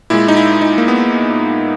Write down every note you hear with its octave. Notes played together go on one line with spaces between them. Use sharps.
A#2 G#3 E4
D#4
E4
D#4
A#3
B3